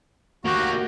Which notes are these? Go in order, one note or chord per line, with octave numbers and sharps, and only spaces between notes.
A#3 F#4 G4